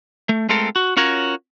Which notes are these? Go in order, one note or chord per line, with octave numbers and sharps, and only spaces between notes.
A3
G#3 A3 C4 F4 A4 A#4
F#4
C#4 F4 F#4 A#4 C#5